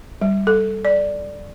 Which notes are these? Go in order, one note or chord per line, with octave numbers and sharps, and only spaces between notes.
G3
A4
D5